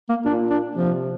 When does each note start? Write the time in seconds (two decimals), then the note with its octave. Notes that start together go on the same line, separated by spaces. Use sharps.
0.09 A#3
0.25 A#2 D4
0.50 D4
0.76 C3 F3